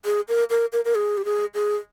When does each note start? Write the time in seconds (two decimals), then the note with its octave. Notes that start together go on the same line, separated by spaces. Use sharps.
0.05 G#4
0.28 A#4
0.50 A#4
0.73 A#4
0.85 A#4
0.95 G#4
1.17 G4
1.25 G#4
1.54 G#4